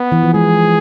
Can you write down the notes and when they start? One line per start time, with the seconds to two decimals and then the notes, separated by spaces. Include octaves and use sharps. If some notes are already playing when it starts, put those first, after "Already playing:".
Already playing: B3
0.12 E3
0.23 F3
0.34 G#3 G#4